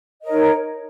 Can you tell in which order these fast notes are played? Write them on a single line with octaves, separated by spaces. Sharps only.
D#5 A#4 C#5 D#4